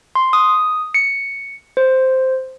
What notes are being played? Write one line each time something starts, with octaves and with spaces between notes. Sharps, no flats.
C6
D#6
C#7
C5